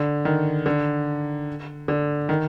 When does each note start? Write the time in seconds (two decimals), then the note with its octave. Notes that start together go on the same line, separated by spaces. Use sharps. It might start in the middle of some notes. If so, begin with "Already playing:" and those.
Already playing: D3
0.25 D#3
0.66 D3
1.88 D3
2.29 D#3